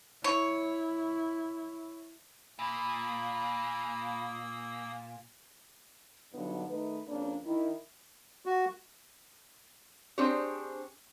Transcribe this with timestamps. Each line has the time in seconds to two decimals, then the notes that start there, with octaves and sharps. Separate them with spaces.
0.24 E4 C#5
2.59 A#2 A#3 B5 D#6 E6
6.34 G2 B2 D3 F#3 B3 D#4
6.69 D#3 A3 D#4 B4
7.08 F2 C#3 A#3 D4
7.45 D#3 E4
8.46 F#4
10.18 C4 D4 G4 G#4 C5 C#5